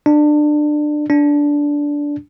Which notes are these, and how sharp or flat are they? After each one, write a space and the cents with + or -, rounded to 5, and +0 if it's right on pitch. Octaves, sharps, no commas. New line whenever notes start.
D4 +25
D4 -10